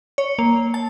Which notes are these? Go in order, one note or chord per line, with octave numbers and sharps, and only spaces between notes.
C#5
A#3
A5